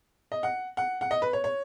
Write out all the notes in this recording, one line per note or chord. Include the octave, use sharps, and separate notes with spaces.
D#5
F#5
F#5
F#5
D#5
B4
C#5
C#5